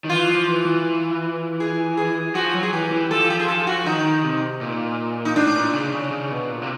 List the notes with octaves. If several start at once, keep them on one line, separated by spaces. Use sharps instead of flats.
D#3
E3 F4
F3
E3
E3
G#4
G#4
F3 F#4
F#3
G#4
E3 G4
E3
F3 A4
G4
G#4
A4
F#4
D#3 D#4
D#3
C3
A#2
D#4
A2 D4
A#2
C#3
C#3
C#3
B2
A#2
C3